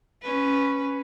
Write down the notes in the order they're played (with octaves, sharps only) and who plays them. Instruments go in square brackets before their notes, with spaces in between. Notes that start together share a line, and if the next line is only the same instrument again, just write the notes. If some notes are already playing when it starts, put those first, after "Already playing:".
[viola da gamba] C#4 B4